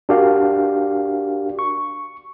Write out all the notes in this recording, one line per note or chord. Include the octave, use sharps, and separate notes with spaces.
D4 F#4 G4 A#4 F5
C#6